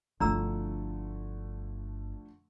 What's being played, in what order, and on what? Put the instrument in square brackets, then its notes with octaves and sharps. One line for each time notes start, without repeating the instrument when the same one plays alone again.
[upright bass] G1 E4 [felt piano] D3 F3 A3 [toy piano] D4 A#5 E6